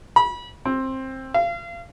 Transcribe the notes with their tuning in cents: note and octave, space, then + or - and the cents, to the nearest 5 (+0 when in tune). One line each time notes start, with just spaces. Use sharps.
B5 -30
C4 +15
F5 -30